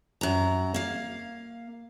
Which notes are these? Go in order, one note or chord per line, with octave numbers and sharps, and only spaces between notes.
F#2 A#5
A#3 F5